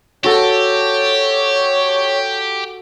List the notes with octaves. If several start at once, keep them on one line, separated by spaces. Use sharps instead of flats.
F#4 G4 A4 C#5